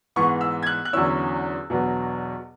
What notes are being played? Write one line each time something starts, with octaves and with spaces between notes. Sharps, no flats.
G#2 E3 B3 C#6
E6
G#6
F#6
F#6
E2 D3 F#3 C#4 E4 E6
E2 B2 F#3 B3 D4